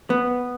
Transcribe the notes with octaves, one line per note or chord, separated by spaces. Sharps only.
B3